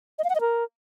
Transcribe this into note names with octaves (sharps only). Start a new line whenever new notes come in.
D#5
F5
F#5
D#5
A#4